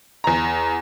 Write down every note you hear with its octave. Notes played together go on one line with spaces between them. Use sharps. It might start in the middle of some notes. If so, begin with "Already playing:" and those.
E2 A#5